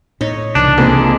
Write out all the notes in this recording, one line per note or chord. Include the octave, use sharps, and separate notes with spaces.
A2 D#4 C#5
C2 C#3 E3 D4 B4
F2 G#3 A#3